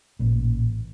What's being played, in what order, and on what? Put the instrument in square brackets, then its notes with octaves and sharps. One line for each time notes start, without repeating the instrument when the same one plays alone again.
[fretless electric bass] A1 A#2